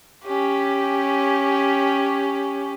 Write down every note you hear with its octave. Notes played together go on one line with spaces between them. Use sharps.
C#4 G4